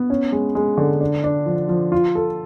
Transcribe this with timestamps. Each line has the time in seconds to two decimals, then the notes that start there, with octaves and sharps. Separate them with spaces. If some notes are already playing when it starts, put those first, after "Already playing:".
Already playing: B3
0.10 C#4
0.32 G#3
0.55 G#3
0.77 D3
1.01 D4
1.24 D4
1.46 F3
1.69 F3
1.92 F4
2.15 A4